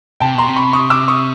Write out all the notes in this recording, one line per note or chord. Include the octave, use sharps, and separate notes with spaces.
C3 G5 A5
B2 A#5 C6
C3
B5 C#6
C#6 D#6
D6 E6
C#6 D#6